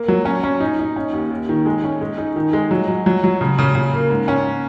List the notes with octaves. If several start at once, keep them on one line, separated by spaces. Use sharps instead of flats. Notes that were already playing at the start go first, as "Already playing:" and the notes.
Already playing: A#3
F#3
C#4
C#4
D#4
D#4
C#4
D#2
D#2
D#3
G#3
C#4
G#3
D#4
D#3
G#3
F#3
F#3
F#3
F#3
C#3
C#3
C#3
A#3
G#2
C#4